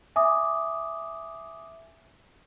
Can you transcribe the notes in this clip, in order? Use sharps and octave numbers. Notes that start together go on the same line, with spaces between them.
E5 G#5 D6 D#6